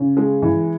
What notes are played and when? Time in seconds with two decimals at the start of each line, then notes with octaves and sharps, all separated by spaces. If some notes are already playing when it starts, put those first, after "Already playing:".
Already playing: C#3
0.17 G#3
0.42 E3